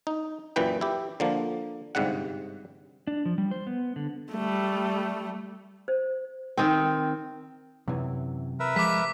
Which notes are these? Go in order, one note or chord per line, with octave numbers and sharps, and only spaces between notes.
D#4
F#2 A#2 E3 B4 G5
E4 G4
D3 F3 A#3
G1 G#2 C3 G3 F#5
D4
F3
G3
C5
B3
D3
G3 A3
C5
D#3 C4
F#2 C3 E3
A#4 B4 E5
F3 G#3 D6 B6